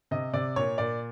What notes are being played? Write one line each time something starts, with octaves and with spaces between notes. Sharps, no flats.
C3 D#5
C3 D5
A#2 C#5
A#2 D5